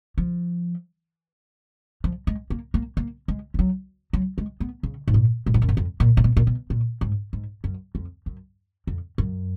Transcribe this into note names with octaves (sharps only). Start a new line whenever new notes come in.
F3
F3
G#3
A#3
A#3
A#3
G#3
F3
F#3
F#3
G#3
B3
C#3
G#2
A#2
A#2
G#2
F#2
G#2
F2
A#2
A#2
B2
A#2
B2
A#2
G#2
G#2
F#2
F2
F#2
F2
F#2